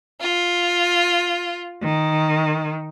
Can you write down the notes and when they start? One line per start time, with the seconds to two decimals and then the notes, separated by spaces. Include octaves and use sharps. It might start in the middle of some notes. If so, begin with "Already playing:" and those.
0.22 F4
1.82 D#3